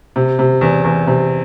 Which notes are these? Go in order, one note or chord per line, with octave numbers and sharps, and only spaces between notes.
C3
C3
E2
E2
C3